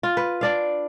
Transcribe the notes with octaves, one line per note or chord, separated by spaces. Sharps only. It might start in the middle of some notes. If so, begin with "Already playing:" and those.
F4
B4
D4 D5 F5